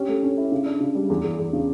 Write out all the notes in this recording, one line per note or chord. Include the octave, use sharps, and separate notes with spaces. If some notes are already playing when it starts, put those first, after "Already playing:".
Already playing: C#4 G4
A3
C#4
E4
C#3
D4
C#3
G3
E2
E2
E2
C#3